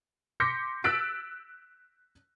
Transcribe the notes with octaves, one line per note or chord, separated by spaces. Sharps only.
C6 D6 G6 A#6 B6 C#7
E6 F#6 A6 B6 D7